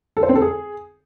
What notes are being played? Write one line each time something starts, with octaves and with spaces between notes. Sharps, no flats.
A4
C5
C4
A4
G#4